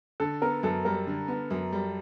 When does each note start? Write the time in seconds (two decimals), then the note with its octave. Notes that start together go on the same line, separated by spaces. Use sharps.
0.20 D3 A4
0.42 B3 A#4
0.63 F#2 A4
0.85 G3 A#4
1.07 D3
1.28 B3
1.51 F#2
1.72 G3